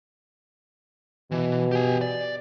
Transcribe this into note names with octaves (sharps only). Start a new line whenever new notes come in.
B2 E3
G4 G#5
D5